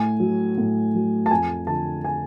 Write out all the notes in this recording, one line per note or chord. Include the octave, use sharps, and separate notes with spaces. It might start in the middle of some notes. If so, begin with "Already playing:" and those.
Already playing: A2 G#5
F#3
A2
F#3
A5
F2 G#5
D3 F3 A5
G#5